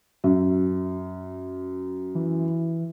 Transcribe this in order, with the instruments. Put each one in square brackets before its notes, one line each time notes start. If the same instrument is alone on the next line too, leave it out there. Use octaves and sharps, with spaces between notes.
[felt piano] F#2
[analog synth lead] E3